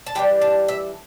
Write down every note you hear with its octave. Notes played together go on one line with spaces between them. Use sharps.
A5
E3 G3 D4 G5
A5
E5